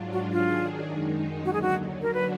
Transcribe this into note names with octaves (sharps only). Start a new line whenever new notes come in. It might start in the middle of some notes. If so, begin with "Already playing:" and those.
Already playing: G#2 F#3 D4 F4
F#4
D#3 F#3 D4 F4 G#4
F#2 D#3 G#3 D#4
D#2 D3 F#3 F#4
G#4
F#4
D3 F#3 D4 F#4 A#4
B4